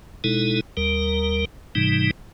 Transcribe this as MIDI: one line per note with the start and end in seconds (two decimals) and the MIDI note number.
0.24 0.61 47
0.24 0.61 56
0.24 0.61 63
0.24 0.61 64
0.24 0.61 69
0.77 1.45 39
0.77 1.45 55
0.77 1.45 70
1.75 2.11 44
1.75 2.11 48
1.75 2.11 52
1.75 2.11 55
1.75 2.11 63